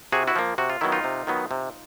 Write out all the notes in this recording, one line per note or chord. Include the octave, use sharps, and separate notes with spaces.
C3 F#4 G#4
E4 F#4
F3 A#3
C3 F#4
F4
D#3 F#3 B3 E4
D#4 F4
C3
D#3 F#3 B3
C3